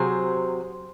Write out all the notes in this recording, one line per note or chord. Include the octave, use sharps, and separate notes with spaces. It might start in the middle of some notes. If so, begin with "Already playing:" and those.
Already playing: C3 F#3 G#4 C5